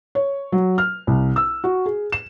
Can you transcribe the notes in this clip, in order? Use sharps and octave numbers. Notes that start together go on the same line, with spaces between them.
C#5
F#3
F6
C2
E6
F#4
G#4
E7